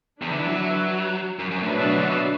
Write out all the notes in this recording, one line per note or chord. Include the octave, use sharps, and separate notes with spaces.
E2 D4 B4 E5
D3
E3
F#3
F#2
F#2
A2 F#3 D4 B4 E5
B2
D3
B2